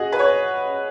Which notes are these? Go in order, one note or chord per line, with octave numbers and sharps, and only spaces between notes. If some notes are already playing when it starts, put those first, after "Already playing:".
Already playing: F#4 G#4 D#5
B4
C#5